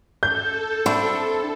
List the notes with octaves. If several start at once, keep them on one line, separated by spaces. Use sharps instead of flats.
A4 G6
C4 D4 E4